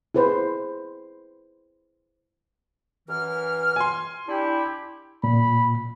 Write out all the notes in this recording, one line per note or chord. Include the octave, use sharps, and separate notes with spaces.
E4 G#4 B4 C5
F#2 E3 F6
G#5 C6
D4 E4 G4
A#2 B5